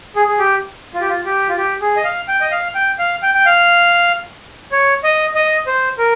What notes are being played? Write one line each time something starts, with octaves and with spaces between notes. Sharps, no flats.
G#4
G#4
G4
F4
G4
F4
G4
F4
G4
G#4
D#5
F5
G5
D#5
F5
G5
F5
G5
G5
F5
C#5
D#5
D#5
C5
A#4